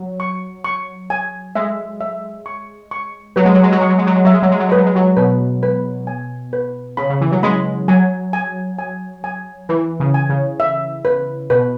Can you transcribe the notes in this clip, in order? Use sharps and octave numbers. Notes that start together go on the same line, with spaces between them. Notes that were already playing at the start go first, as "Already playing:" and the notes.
Already playing: F#3
C#6
C#6
G#5
G#3 E5
E5
C#6
C#6
F#3 B4
G#3
F#3
G#3
F#3
G#3 C#6
F#3
G#3
F#3
G#3
F#3 E5
G#3
F#3
G#3
F#3
G#3 B4
F#3
G#3
F#3
B2 B4
B4
G#5
B4
C#3 B5
C#3
E3
F#3
G#3 B5
F#3 G#5
G#5
G#5
G#5
E3 B4
C#3
G#5
C#3
E5
B4
B2 B4